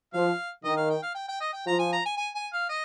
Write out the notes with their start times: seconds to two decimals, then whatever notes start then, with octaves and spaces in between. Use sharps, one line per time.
0.13 F3 F5
0.64 D#3 D#5
0.77 F5
0.90 G5
1.03 F5
1.15 G5
1.29 G5
1.41 D#5
1.53 G5
1.66 F3 A#5
1.79 G#5
1.93 A#5
2.06 G#5
2.17 G#5
2.35 G#5
2.53 F5
2.69 D#5